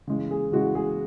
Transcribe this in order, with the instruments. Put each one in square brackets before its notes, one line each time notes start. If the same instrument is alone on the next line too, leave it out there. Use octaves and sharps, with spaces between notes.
[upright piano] C#3 E3 G#3
G#4
C#3 E3 G#3 F#4
G#4